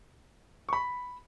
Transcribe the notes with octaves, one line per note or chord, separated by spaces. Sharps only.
C#6
B5